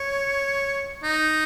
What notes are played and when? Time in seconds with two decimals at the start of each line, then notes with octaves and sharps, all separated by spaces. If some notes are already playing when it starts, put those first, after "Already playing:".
Already playing: C#5
1.04 D#4